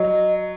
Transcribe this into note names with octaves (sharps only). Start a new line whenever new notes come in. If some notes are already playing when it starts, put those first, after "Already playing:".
Already playing: F#3 D#5